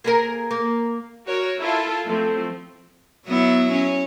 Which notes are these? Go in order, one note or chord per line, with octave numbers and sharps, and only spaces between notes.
A#3 G#4 A#4
A#3
F#4 A#4 C#5
E4 F4 A4
F3 A3 C4
F#3 B3 E4
C#4